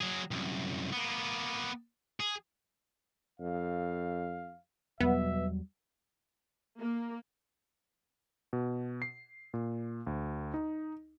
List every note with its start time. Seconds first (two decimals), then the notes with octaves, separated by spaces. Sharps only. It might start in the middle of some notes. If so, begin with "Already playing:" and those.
0.01 F#3 G#4
0.31 C2 F#2
0.92 A#3 B3
2.20 G#4
3.40 F2 F5
5.00 E2 B2 F#3 G3 B3 E5
6.80 A#3
8.53 B2
9.02 C7
9.54 A#2
10.07 D2
10.54 D#4